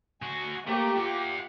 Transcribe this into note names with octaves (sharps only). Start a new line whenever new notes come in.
D2 F#4 G#5
A3 A#3 G4
F4 E5 F#5